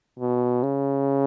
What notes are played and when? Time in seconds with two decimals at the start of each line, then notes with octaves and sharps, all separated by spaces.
0.19 B2
0.63 C#3